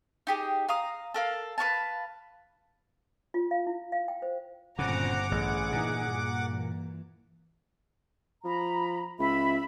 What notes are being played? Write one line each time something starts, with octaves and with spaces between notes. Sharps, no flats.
D#4 G4 G#4
F5 A#5 D#6
A4 A#4 F5
B4 C#5 F5 A5
F4
F5
E4
F5
G5
C5
G1 A#2 C#3 C4 F#5 G#5 A#5 D6
A1 G#4
A#2 E3 D#4
G2 A#3
E3
F3 A#5 B5
C#2 E5 B5